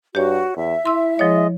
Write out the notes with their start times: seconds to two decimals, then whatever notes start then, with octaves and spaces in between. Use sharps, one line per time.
0.15 G2 F#4 G4 C#5
0.56 E2 E5
0.85 E4 C6 E6
1.19 F3 G#3 C#5 D#5